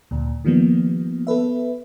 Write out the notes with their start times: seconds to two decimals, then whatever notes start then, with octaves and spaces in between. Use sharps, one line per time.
0.11 D2 A#2
0.45 D#3 F3 G3 A#3 B3
1.27 B3 A4 B4 E5